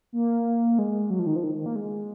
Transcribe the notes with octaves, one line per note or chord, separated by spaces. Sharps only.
A#3
G#3
F#3
F3
D#3
F3
D#3
D#3
A#3
G#3